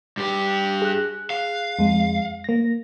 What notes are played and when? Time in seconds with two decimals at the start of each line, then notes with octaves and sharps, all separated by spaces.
0.17 G2 G4
0.82 G#4 F#6
1.30 F5
1.79 F2 G#3
2.44 A#3 A#6